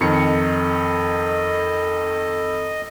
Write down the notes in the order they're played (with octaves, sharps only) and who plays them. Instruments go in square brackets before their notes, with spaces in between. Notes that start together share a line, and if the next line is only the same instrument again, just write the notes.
[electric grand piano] F2 D#3 C#7 [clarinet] A4 [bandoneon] D#5